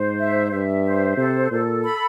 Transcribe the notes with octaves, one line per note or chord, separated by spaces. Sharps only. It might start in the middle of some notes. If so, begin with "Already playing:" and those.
Already playing: G#2 C5
E5
G2 E5
C5
C3 A4
A#2 A4
B5